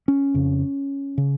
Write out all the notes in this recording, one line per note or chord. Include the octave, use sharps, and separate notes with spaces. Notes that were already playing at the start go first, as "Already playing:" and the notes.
C#4
F2 C#3
C#3